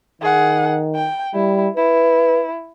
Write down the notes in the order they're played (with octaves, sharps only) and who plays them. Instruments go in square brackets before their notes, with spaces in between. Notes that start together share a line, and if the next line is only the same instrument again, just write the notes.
[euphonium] D#3 [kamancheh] G#4 F#5
[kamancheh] G5
[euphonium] G3 [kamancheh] E4
[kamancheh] E4 [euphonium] B4